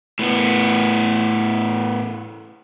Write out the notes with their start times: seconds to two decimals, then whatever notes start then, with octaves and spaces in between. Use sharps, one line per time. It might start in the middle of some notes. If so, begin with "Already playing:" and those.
0.19 A2 B3